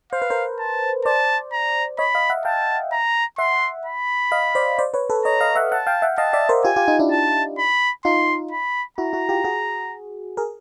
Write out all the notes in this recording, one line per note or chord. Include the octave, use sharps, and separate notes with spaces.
C5 F5
B4
A#4 C5
A5
C5 D5 A5
A#5
C#5 D#5 B5
D#5 F5
E5 F#5
F5 G5 A5
A#5
E5 F#5 C6
B5
D#5 F5
C5 D5
C5 D5
B4 C#5
A4 B4
C#5 D#5 A#5
D#5 F5
E5 F#5
E5 F#5 A5
F5 G5
E5 F#5
D#5 F5 A5
D5 E5
A#4 C5
F4 G4 G#5
F4 G4
D#4 F4
D4 E4
A5
B5
D#4 F4 C6
B5
E4 F#4 A#5
E4 F#4
F4 G4
F#4 G#4
G#4 A#4